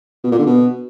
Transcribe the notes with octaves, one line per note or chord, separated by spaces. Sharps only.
B2
A#2
D3
B2